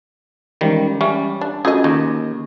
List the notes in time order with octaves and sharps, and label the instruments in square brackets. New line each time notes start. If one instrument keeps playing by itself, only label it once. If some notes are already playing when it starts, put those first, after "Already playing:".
[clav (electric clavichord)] D#3 G3 [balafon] E3 G#3 C#4
[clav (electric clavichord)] G3 [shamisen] C#4 [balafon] E5
[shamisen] D4
[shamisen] A3 D#5 [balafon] C#4 F4 F#4 [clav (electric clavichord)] G#4
[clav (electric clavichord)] D#2 [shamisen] D#4